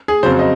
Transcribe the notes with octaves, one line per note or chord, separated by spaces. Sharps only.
G#4
F2 C#3 F#3 C5
D#5